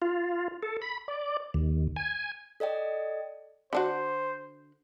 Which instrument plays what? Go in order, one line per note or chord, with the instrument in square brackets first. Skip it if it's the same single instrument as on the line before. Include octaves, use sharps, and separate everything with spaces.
[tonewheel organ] F4
A4
B5
D5
D#2
G#5
[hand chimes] A4 D5 D#5 G5
[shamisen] D3 D4 F#4 [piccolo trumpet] C5